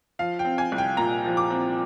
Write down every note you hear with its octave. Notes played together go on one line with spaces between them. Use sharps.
F3 F5
G5
C4
G#5
C2
G5
A#2 A#5
F3
D6
C4